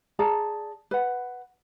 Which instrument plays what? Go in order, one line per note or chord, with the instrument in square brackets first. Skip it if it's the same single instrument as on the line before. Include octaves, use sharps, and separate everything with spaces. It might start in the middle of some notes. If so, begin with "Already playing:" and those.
[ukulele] G#4 D5 A5 A#5
B4 F#5